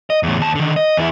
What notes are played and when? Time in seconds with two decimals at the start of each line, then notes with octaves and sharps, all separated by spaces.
0.10 D#5
0.23 E2 A2
0.38 D#2 A5
0.55 D3 D#3
0.76 D#5
0.97 E2 E4